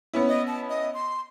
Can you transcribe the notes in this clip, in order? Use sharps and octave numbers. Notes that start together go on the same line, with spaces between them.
B3 C#4 E4
D#5
A5
D#5
C6